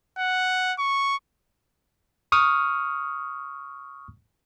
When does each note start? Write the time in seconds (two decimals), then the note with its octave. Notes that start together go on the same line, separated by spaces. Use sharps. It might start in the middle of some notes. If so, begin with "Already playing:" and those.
0.19 F#5
0.79 C#6
2.32 C#6 D#6 F6